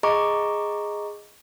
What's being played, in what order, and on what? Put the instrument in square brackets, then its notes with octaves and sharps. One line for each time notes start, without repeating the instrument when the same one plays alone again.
[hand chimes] G#4 D#5 A#5 C#6 D6